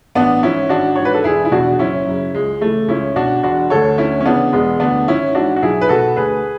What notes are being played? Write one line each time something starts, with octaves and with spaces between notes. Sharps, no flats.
A1 B3 D4
G#2 E3 C#4 E4
G#1 D4 F#4
G#2 E3 C#5
B4
A4
E1 E4 G#4
E4
E2 B2 D4 F#4
F#1 C#4 E4
F#2 C#3
C#2 G#3
C#3 E3 A3
C#2 C#4 E4
B2 D4 F#4
E1 D4 F#4
D2 D3 A4 C#5
D2 C#4 E4
C#4
C#3 E3 B3 D4
E1 G#3 B3
D2 D3 B3 D4
G#1 C#4 E4
G#2 E3 D4 F#4
F#4
B1 E4 G#4
B4
B2 F#4 A4
D2 G#4 B4